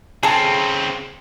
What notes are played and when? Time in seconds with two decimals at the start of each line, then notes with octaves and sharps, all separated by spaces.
0.23 C#3 C4 G#4 A4